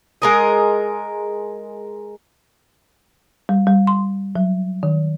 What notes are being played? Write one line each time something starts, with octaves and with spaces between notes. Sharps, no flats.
G#3 A#4 D#5
G3
G3
C6
F#3
D#3